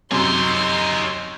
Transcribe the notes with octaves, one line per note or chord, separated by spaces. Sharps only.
F#2 C3 D#4 C#5 C6